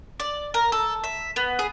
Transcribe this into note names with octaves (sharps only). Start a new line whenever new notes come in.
D5
A#4
A4
E5
B3
G#4